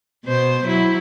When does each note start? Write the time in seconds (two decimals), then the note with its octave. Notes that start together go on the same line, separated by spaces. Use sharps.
0.25 B2 C5
0.64 F#3 E4